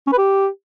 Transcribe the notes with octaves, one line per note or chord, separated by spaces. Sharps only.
C#4
B4
G4